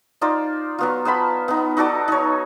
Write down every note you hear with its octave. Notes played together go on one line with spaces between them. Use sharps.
D#4 F4 C5 D5
F#3 B3 F4
B3 C5 A5 B5
B3 D#4
D#4 F#4 A4 D5
D#4 C#5